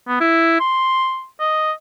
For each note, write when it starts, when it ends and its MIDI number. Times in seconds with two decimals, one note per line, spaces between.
0.08 0.20 59
0.20 0.60 64
0.60 1.26 84
1.40 1.72 75